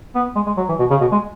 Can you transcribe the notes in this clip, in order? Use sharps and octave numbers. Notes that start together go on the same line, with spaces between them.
B3
G#3
G#3
F#3
E3
B2
C#3
B2
G#3